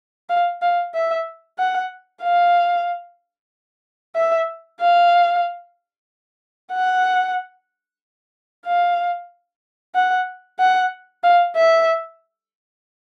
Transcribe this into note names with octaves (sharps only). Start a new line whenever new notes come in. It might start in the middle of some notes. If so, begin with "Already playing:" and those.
F5
F5
E5
F#5
F5
E5
F5
F#5
F5
F#5
F#5
F5
E5